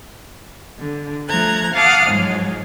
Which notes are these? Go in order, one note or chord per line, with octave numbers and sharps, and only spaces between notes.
D3
F3 A3 A#5 F#6 G#6
F5 F#5 A5 D6 D#6 F6
G#2 F3 F#3 G#3